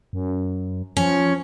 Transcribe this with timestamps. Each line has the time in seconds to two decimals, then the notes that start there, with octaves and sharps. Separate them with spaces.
0.13 F#2
0.97 F3 C#4